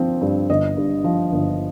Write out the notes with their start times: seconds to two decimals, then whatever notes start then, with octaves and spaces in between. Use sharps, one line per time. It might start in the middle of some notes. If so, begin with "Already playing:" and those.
Already playing: F3 C4
0.21 G2
0.50 G1 D#5
0.77 G2
1.04 F3
1.32 G1